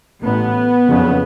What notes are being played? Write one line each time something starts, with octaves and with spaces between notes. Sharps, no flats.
A1 A2 B3
F#1 F2 C#3